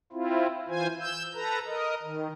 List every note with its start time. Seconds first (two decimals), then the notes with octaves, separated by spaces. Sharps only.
0.12 C4 E4 F4
0.68 E3 F4 C5 G#5
1.00 E6 G6
1.34 A4 B4 A#5
1.67 A#4 D#5
2.03 D#3